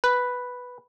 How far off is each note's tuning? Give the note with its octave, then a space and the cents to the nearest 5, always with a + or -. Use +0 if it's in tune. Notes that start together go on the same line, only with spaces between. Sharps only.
B4 +0